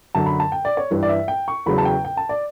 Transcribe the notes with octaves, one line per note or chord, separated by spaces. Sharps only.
F#2 D3 F#3 A5
B5
A5
G5
D5
C#5
G2 E3 G3
D5
E5
G5
C#6
E2 C#3 F#3 B5
A5
G5
G5
A5
D5